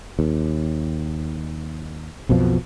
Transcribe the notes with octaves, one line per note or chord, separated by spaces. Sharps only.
D#2
B1 F2 B2 F3